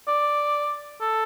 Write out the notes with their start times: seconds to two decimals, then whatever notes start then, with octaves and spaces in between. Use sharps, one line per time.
0.07 D5
1.01 A4